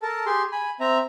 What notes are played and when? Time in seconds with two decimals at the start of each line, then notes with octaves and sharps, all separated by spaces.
0.02 A4 A#4 A5
0.26 G4 G#4 C6
0.52 G#5 B5
0.80 C4 E5 A#5